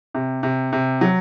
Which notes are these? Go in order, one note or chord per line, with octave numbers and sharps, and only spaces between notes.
C3
C3
C3
F#3